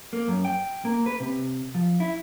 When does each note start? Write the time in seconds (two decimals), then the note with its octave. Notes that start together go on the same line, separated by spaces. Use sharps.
0.13 A#3
0.28 F#2
0.45 G5
0.85 A#3
1.06 B4
1.20 C3
1.75 F3
2.00 E4